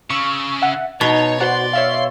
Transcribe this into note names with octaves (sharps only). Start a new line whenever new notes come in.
C#3 C#6 E6
E5 F#5
B2 D#4 C#5 A5
F#4 C5 D5 F#5 A#5 C6
C#5 E5 F5